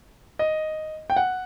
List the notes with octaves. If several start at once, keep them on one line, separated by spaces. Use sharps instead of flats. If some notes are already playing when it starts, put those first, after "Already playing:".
D#5
G5
F#5